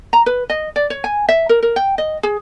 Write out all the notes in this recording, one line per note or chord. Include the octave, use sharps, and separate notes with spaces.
A#5
B4
D#5
D5
C#5
G#5
E5
A#4
A#4
G5
D#5
G#4